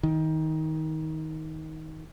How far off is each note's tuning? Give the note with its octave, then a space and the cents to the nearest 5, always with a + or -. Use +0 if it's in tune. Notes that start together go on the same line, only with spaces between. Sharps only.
D#3 +20